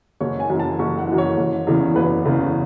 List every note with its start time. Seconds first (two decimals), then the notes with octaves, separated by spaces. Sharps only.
0.20 F#1 C#5
0.40 G#5
0.50 F#2 E3
0.59 A5
0.79 F#1 C#6
0.99 F#5
1.09 F#2 E3
1.18 C#5
1.37 F#1
1.67 E2 C#3 E3
1.96 F#1 B4
2.25 E2 C#3 E3